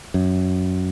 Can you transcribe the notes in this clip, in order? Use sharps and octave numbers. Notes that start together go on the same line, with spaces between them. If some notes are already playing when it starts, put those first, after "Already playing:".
F#2